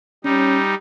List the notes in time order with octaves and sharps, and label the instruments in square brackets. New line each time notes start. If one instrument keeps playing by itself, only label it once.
[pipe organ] G3 D#4 [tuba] C#4